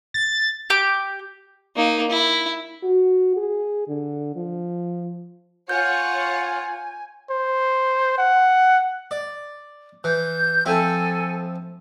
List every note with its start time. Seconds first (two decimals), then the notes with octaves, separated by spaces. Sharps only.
0.14 A6
0.70 G4 D6
1.76 A#3 D#4
2.10 E4
2.83 F#4
3.37 G#4
3.88 D3
4.36 F3
5.69 F4 C#5 F#5 G#5 G6
7.30 C5
8.18 F#5
9.11 D5
10.04 E3 G6
10.66 F3 C4 E4 A4 G#5